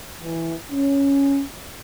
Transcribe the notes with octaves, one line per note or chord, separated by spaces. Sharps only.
E3
C#4